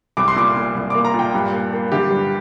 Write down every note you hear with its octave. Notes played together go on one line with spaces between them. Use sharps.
C2 D6
C6
A#2 D6
A#2
C2
A#3 D6
A#5
A#2
G5
G2
A#3
A#3
D3 G4
G2